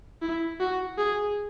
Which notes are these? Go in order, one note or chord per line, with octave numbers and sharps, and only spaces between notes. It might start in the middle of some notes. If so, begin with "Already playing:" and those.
E4
F#4
G#4